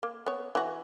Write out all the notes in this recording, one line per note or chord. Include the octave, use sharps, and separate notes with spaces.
A#3
B3 C#5
E3 F#4